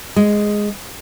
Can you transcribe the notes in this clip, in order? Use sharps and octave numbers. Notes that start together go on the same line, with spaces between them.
G#3